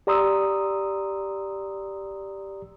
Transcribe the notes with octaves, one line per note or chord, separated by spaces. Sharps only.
G4 D5 A#5 C6 D#6 E6